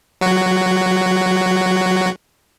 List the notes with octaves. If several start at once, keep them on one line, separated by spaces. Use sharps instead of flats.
F#3 F#4